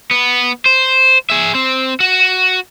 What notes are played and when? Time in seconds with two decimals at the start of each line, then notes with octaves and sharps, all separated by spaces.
0.11 B3
0.66 C5
1.30 G#4 E5
1.55 C4
2.00 F#4